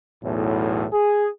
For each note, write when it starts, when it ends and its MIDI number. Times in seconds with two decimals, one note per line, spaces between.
0.24 0.86 35
0.24 0.86 40
0.24 0.86 45
0.93 1.29 68